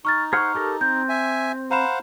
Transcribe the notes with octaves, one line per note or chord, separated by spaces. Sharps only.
D#4 C#6 F6 A6
G#4 C5 F#5 C#6 F6
G4 A4 A#4
C4 G6
E5 G#5
C5 F5 F#5 A#5 B5 E7